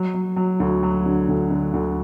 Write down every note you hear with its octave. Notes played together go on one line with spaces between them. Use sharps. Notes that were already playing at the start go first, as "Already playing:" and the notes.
Already playing: F#3
F#3
F#3
D2
F#3
D3
D2
D3
D2